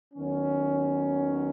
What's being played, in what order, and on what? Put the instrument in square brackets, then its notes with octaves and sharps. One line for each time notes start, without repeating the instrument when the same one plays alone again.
[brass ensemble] D#2 D#3 F#3 B3 C#4